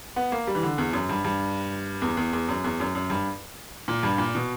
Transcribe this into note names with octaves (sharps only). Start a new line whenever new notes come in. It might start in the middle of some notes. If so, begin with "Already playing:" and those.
B3
A#3
G3
E3
D3
E2
F#2
G2
G2
E2
E2
E2
F#2
E2
F#2
F#2
G2
A#2
G2
A#2
B2